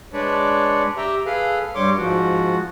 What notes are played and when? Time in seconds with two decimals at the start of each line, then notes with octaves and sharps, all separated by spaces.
0.13 G#3 D4 B4 C#5 D5
0.97 G4 E5 G5 A#5
1.26 G#4 A4 B4 F5
1.75 G2 G3 C#5 C6 D6
1.97 G#2 F3 F#4